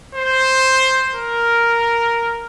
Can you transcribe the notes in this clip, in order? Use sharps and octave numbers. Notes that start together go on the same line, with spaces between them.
C5
A#4